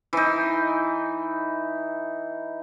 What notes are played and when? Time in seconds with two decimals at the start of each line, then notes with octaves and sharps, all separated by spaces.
0.13 E3 D#4